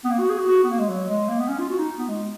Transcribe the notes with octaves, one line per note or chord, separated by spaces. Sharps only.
B3
A#3
F#4
G#4
F#4
F#4
B3
A#3
G#3
F#3
G#3
A#3
B3
C#4
F4
F#4
D#4
B3
G#3